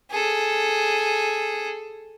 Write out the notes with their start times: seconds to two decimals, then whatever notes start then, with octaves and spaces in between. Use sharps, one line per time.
0.11 G#4 A4